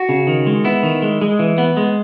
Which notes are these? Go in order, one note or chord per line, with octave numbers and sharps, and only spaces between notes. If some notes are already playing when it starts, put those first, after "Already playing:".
Already playing: F#4
C#3
D#3
G#3
B3 E4
D#3
G#3
G#3
E3
B3
G#3